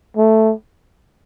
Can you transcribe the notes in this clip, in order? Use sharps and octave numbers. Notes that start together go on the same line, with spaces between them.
A3